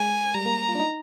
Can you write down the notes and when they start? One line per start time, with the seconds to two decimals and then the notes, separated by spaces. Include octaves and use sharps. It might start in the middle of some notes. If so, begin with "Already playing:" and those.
Already playing: G#3 G#5
0.34 G3 A#5
0.46 A#3
0.69 F4
0.75 D4
0.80 D#4